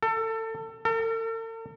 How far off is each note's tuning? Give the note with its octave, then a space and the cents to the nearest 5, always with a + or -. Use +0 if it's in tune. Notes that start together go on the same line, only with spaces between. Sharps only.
A4 +25
A4 +45